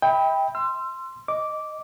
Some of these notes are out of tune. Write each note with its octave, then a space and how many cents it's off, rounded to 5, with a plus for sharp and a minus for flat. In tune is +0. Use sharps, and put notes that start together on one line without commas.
E5 -45 G5 +15 B5 +0
C6 +0 E6 +40
D#5 +0 D6 -10